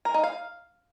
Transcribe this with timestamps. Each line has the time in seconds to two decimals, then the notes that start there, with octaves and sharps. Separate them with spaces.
0.05 A#4
0.14 D#4
0.24 F5